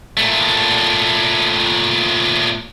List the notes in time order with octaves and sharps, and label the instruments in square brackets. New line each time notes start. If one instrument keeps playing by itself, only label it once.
[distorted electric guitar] A#2 A3